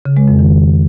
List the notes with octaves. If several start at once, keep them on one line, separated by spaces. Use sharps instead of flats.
C#3
G#3
F2
D#3